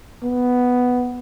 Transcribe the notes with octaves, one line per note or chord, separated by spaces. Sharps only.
B3